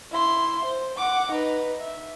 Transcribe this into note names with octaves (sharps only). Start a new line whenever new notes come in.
E4 C6
C5
F#5 D6
D#4 B4
E5